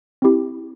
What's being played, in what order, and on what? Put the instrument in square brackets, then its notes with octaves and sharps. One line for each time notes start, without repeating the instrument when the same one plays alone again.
[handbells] C4 E4 G4